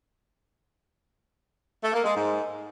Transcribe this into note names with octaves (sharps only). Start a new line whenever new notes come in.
A3
A#3
G#3
G#2